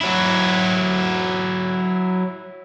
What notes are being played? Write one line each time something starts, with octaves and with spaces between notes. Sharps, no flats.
F#3 E4